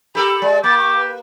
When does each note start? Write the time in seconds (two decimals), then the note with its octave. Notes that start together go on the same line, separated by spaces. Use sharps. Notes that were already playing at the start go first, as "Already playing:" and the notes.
0.15 G4 A4 A#4 B5
0.42 G#3 D5
0.64 A#3 G4 D6 A6
0.77 C#6
0.97 B4